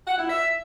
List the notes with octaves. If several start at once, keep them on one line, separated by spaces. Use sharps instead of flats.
F#5
E4
E5